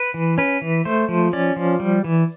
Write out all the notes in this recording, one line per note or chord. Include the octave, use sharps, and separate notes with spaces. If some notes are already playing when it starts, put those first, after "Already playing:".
Already playing: B4
E3
C#4 B4
E3
A3 C5
F3
C#4 D5
F3
G3
E3